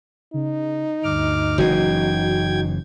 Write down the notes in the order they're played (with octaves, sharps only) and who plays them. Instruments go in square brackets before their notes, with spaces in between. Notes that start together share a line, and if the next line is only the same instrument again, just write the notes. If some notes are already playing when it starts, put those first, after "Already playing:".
[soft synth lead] C#3 [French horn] D#4
[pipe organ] D2 D6 F6 [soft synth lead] G2
[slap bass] F#1 C#3 E3 [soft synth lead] F#4 [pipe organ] G5 G#6